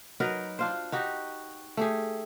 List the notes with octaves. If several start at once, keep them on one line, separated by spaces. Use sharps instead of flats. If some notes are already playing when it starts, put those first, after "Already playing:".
F#3 D#4 A#4 B4
D4 F4 C5
D#4 F#4 G4
A3 G4 G#4